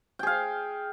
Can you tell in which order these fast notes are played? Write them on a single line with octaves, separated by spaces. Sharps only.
G5 G#4 F5